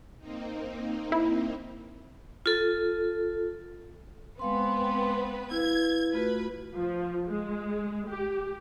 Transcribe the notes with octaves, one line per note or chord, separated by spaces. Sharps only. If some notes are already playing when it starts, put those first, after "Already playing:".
A#3 C4 D#4
E4
F4 A4
G#3 B3 C4 B4 F5 C6
E4 B4 F5 G#6
A3 F4 F#4 B4
F3
G#3
G4